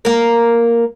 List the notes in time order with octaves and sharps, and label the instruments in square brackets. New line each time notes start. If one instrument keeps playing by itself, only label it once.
[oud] A#3 A#4